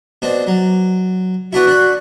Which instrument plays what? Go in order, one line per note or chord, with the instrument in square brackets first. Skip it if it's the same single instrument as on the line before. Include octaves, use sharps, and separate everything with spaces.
[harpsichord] B2 C4 D4
F#3
[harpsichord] B3 D4 E4 [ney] F#4
[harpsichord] D4 B5